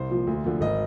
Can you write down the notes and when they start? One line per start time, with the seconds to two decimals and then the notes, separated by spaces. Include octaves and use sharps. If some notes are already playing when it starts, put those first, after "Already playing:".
Already playing: C2 C5
0.10 A#2 F3
0.27 D2
0.44 D3 F3
0.61 G#1 D#5